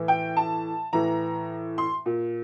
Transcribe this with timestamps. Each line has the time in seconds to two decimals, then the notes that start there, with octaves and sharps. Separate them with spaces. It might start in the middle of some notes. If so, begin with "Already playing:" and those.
Already playing: A2 E3
0.08 G5
0.37 A5
0.93 A2 E3 A#5
1.78 C6
2.06 A#2